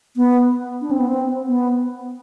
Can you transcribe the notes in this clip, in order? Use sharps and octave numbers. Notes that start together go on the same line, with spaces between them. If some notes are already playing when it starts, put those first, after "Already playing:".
B3
D4
C4
B3
C4
B3